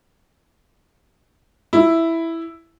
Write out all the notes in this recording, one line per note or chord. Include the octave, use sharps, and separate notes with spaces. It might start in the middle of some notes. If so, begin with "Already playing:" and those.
E4